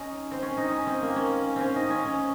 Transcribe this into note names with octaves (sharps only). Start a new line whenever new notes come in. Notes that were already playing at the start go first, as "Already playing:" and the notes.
Already playing: C#4 D#4
C4
C#4
D#4
C#4
C4
A#3
C#4
C4 C#4
D#4
C#4
C#4